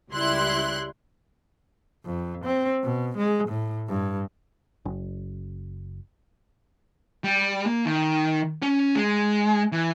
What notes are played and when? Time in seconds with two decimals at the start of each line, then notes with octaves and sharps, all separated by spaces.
0.11 C#2 G3 E4 C6 F#6
2.05 F2
2.45 C4
2.83 B2
3.18 G#3
3.48 A2
3.89 G2
4.85 F#1
7.24 G3
7.66 A#3
7.85 D#3
8.62 C#4
8.95 G#3
9.72 E3